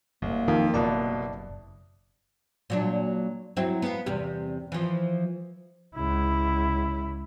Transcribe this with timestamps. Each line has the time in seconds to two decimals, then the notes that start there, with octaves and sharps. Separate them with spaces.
0.22 F#1 C2 A#3
0.48 F2 D#3 F3
0.74 F#1 C2 B2 D5 A5
2.70 A#2 F#3 D4
3.57 F#3 C4 E4
3.82 B3 F5
4.06 E2 C3 G3
4.72 E3 F3
5.95 C#2 E4